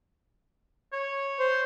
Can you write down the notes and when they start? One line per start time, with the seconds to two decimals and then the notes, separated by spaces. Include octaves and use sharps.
0.93 C#5
1.39 C5